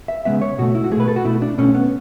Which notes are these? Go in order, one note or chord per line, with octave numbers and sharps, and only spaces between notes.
E5
C#3 G#3 B3 E5
C#5
B2 A3 F#4
E4
F#4
B2 A3 G#4 B4
A4
F#4
B2 A3 E4
D4
B2 A3 C#4
B3